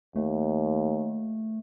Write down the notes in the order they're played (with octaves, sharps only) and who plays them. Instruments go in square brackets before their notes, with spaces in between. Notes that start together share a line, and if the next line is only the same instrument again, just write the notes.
[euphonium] D#2 [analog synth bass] A3